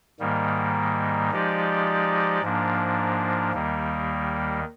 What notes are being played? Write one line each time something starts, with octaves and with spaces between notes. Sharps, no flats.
G#2 D#3 G3 A#3
F3 G#3 D#4 G4 D5
G#2 F3 A#3 D4
D#2 D#3 G3 A#3